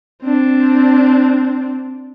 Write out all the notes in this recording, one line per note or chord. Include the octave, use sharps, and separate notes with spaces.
C4 D4